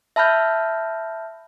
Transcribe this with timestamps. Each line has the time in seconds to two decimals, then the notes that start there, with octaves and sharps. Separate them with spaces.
0.16 E5 A5 B5 F6 G6